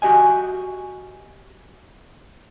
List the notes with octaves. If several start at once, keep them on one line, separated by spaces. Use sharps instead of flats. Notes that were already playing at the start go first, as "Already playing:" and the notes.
F#4 G4 D#5 G#5